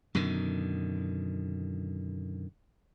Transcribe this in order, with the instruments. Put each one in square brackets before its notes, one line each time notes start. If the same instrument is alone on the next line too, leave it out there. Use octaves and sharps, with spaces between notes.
[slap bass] F#2 B2 D3 D#3